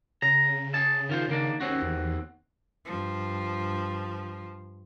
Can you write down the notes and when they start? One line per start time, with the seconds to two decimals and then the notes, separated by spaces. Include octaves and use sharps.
0.22 C#3 A#5
0.74 G#4 A5
1.09 D#3 F4 C5
1.29 D#3 A#3 D4
1.61 D#2 C4 C#4 F#4
1.82 E2
2.85 G2 F3